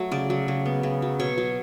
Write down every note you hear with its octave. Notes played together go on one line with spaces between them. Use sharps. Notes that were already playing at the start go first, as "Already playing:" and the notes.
Already playing: F#3 A3
C#3 D5
F#3
C#3
B3
C#3
F#3
B2 C#5
F#3